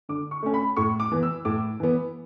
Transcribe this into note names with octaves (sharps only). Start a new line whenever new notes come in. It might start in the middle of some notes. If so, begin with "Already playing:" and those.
D3 D6
C#6
A3 C#4
B5
A2 C#6
D6
E3 B3
E6
A2 D6
E3 B3